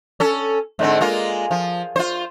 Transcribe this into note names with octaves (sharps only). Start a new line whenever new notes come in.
C#4 A4
G#2 D3 C4
G#3 A#3 F4
F3
F4 C5